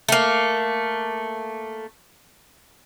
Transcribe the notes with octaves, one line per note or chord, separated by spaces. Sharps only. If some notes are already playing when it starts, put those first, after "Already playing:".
A3 A#3